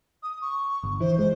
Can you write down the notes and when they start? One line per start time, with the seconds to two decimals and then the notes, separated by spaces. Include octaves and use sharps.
0.23 D#6
0.42 C#6
0.83 G1
1.01 E3 C5
1.19 G#3 C5